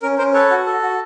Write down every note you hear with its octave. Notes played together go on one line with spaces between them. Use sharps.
C#4 A#4
C#4 A#4 C5
A4 B4 C#5
F#4
A4
F#4